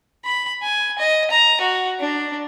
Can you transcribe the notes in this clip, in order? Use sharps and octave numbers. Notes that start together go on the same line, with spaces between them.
B5
G#5
D#5
A#5
F#4
D4